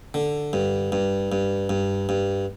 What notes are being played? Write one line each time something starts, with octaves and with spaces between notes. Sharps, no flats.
D3
G2
G2
G2
G2
G2